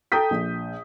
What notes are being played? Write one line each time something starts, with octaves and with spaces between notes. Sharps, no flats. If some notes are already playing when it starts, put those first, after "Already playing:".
A4 G5 A#5 D#6 G6 B6
A#1